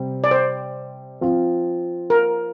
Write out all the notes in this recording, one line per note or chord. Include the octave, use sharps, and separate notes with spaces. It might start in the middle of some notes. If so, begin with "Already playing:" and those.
Already playing: C3 G3 C4
D5
C5
F3 C4 F4
A#4